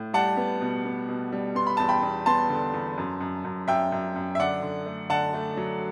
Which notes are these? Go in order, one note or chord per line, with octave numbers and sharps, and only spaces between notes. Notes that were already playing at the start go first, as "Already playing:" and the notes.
Already playing: A2
G3 F#5 A5
B3
B2
B3
B2
G3
B3 C6
B5
E2 A5
G5 B5
E2
B3 A5 C6
D3
E2
F#2
F#2
F#2
F#2 E5 G5
F#2
F#2
E5
D3 D5 F#5
D3
A3
D3 F#5 A5
A3
F#3